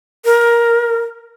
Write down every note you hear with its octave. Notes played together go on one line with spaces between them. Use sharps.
A#4